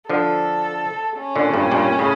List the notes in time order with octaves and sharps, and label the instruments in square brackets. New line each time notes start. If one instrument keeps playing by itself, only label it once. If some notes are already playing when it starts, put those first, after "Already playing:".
[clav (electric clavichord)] D3 F3 [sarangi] A4
[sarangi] C#4
[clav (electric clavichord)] A#2 D3
G2 A#2
G2 A#2
A2 C#3